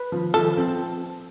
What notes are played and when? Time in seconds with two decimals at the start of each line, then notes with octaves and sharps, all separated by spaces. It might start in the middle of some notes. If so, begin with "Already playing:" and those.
Already playing: B4
0.12 F3
0.34 F3 A4
0.57 C4